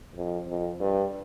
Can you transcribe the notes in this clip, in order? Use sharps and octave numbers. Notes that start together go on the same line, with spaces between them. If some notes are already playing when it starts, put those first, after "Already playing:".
F2
F2
G2